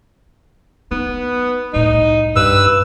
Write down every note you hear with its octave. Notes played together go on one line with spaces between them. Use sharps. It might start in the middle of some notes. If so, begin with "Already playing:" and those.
B3 D#4
C2 A2 D#4
G2 B4 E6